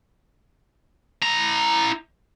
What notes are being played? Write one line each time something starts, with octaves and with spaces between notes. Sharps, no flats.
E4 A#5